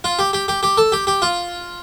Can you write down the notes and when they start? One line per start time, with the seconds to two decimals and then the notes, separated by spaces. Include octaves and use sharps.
0.04 F4
0.19 G4
0.33 G4
0.48 G4
0.63 G4
0.78 A4
0.92 G4
1.07 G4
1.22 F4